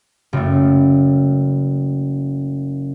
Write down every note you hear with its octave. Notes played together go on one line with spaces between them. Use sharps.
F#1 A3